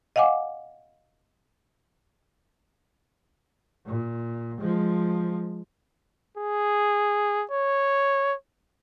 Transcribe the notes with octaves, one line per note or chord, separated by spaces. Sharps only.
D#5 F5 F#5 G#5 D6
A#2
F3 G#3
G#4
C#5